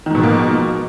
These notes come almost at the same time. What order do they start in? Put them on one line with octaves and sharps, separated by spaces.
D#3 G#2 B2 F3 A#3